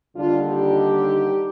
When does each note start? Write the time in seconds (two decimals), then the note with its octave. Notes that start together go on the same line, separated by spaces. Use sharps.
0.16 D#2 D3 G3 D4 F4
0.47 D#4 G4